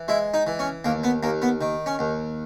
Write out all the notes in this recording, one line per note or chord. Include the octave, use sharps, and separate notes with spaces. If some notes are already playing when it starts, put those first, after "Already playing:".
Already playing: E3
G#3 E4
D#4
E3
C#4
D#2 A#3
B3
D#2 A#3
B3
D#3
C#4
D#2